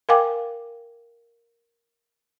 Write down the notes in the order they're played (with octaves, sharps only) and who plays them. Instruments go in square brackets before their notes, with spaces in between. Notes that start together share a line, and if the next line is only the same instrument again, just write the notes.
[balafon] A#4 F5 G5 G#5 D6